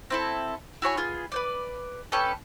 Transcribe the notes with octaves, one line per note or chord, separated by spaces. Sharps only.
C4 E4 A4
E4 F#4 C#5 G#5
B3 F4 G#4
B4 C5 D5
C#4 G4 A4 B4